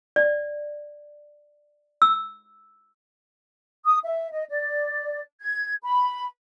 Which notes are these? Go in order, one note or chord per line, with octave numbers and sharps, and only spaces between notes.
D5
E6
D#6
E5
D#5
D5
G#6
B5